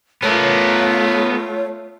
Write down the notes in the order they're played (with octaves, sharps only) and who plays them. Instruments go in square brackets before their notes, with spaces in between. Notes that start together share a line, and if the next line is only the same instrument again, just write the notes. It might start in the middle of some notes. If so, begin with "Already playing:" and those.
[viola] A3 F4 [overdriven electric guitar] B3 A#4 [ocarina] C#5